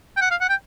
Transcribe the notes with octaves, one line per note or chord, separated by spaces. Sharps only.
G5
F#5
F5
F#5
G5